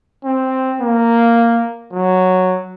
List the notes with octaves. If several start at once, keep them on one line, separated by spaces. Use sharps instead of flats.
C4
A#3
F#3